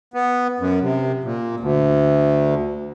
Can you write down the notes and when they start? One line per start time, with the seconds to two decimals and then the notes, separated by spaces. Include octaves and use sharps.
0.14 B3
0.60 F#2
0.82 C3
1.24 A#2
1.60 D2